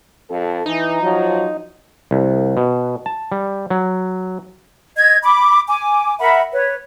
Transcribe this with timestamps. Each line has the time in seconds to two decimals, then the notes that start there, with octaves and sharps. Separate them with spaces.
0.29 F2 A4
0.66 E3 D#4
1.01 F3 F#3
2.11 C2
2.57 B2
3.06 A5
3.32 G3
3.70 F#3
4.96 D#5 G#6
5.22 B5 D6
5.67 G#5 D6
6.20 A#4 E5 F#5 B5
6.52 B4 C#5